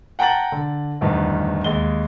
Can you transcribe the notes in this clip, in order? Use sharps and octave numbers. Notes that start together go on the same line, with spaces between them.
F#5 G5 A5 A#5 A6 F#7
D3
D1 E2 G2 D#3 B4
D#2 G#3 G7